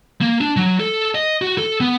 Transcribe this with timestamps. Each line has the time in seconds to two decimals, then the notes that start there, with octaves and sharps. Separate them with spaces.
0.21 A#3
0.41 D4
0.57 F#3
0.80 A4
1.15 D#5
1.42 F#4
1.58 A4
1.81 B3